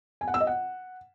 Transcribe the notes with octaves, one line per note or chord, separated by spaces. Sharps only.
G#5
F#5
E6
D#5
F#5